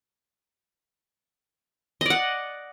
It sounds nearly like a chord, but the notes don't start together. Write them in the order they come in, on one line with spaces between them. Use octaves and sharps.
D#5 D5 F#5